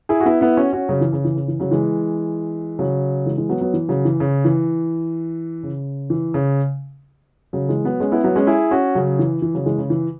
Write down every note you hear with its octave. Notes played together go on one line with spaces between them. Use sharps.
E4 G#4
F#4
B3 E4
B3 E4
C#4 F#4
C#4 F#4
C#3 F#3
E3
C#3
E3
C#3
E3
C#3 F#3
E3 G#3
C#3 F#3
E3 G#3
E3 G#3
F#3 B3
F#3 B3
E3
C#3 F#3
E3
C#3
E3
C#3
E3
C#3
C#3 F#3
E3 G#3
F#3 B3
G#3 C#4
B3 E4
F#3 B3
G#3 C#4
E4 G#4
C#4 F#4
C#3 F#3
E3
E3
C#3 F#3
E3 G#3
C#3
E3